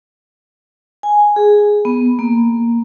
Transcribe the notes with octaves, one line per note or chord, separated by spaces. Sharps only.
G#5
G#4
B3
A#3